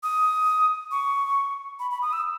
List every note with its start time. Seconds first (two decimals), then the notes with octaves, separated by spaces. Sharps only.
0.03 D#6
0.91 C#6
1.79 B5
1.91 B5
2.02 D#6
2.13 E6